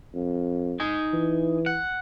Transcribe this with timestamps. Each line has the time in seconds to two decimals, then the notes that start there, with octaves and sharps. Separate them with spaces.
0.15 F2
0.80 D#4 G#5
1.13 E3
1.66 F#5